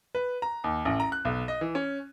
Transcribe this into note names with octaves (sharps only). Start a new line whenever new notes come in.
B4
A#5
D#2
A1
A#5
F#6
B1
D#5
E3
C#4